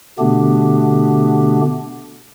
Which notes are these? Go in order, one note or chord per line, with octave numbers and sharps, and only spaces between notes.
B2 D3 A3 B3 D4 G4